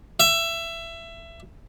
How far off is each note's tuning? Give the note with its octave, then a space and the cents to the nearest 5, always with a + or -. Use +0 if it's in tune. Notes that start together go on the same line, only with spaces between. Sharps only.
E5 +20